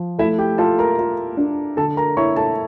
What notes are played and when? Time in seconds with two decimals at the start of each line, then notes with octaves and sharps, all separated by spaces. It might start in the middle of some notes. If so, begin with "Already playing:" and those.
Already playing: F3
0.19 A3 E4 E5
0.38 G4 G5
0.58 F4 A4 A5
0.79 A#4 A#5
0.99 F4
1.37 D4
1.77 D3 A4 A5
1.97 A#4 A#5
2.17 E4 C#5 C#6
2.36 A4 A5